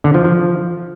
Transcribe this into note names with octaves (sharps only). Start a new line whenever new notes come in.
D3
F3
F3